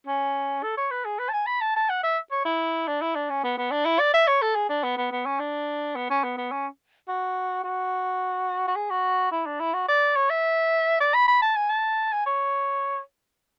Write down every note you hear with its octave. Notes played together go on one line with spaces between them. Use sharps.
C#4
A4
C#5
B4
G#4
B4
A5
G#5
B5
A5
A5
F#5
E5
C#5
E4
D4
E4
D4
C#4
B3
B3
D4
E4
D5
E5
C#5
A4
G#4
D4
B3
B3
B3
C#4
D4
B3
C#4
B3
B3
C#4
F#4
F#4
F#4
G#4
F#4
E4
D4
E4
F#4
D5
C#5
E5
D5
B5
B5
A5
G#5
A5
G#5
C#5